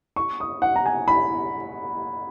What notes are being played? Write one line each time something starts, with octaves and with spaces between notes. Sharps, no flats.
C#6
D#6
F#5
A#5
G#5
B5